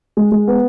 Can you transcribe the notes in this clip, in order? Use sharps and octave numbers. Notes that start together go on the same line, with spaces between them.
G#3
G#3
B3